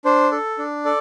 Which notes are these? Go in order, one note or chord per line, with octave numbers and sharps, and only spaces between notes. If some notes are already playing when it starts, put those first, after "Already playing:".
D4 C5
A4
D4
A4 D5